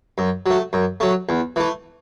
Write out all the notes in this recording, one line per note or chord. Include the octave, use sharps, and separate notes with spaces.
F#2
F#3 A3
F#2
F#3 A3
E2
E3 A3